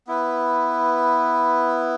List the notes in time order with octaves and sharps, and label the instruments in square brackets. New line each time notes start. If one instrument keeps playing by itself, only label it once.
[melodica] B3 E4 B4